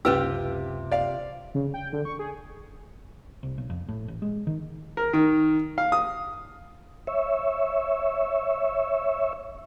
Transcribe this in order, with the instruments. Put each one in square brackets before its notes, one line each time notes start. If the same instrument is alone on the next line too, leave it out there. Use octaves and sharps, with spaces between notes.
[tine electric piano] C#2 F#2 [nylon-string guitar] C3 F4 G4 [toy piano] C#4 B4 E6
[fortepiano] D5 F5
[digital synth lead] C#3
G5
D3
C#6
G#4
[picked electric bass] C2
B1
F2
A2
A1
G#3
D#3
[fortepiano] A#4
D#3
F5
D#6
[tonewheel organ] C#5 E5